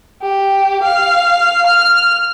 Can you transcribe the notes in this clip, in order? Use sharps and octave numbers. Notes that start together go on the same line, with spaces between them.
G4
F5
F6